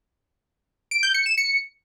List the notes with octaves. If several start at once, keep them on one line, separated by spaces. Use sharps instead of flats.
D7
G6
C#7
E7
C#7